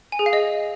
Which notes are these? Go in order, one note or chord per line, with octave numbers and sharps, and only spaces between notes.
G#5
G#4
F5
D#5